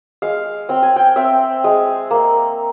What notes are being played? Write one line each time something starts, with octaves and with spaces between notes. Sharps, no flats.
G#3 F5
C4 G5
G#5
G5
C4 E5
G#3
A#3